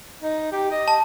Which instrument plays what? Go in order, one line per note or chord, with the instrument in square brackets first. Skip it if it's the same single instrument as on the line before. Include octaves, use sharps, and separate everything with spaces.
[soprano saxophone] D#4
G4
D#5
[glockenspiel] A5